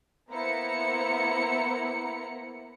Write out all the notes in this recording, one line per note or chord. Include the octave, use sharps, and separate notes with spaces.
A#3 B3 E4 C5 A#5 C#7